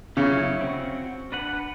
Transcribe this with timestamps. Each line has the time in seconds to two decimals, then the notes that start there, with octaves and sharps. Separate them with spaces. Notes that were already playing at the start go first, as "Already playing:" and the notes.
0.17 C#3 F#3 E4 C#5
0.61 C4 F#4
1.32 D4 B4 F#5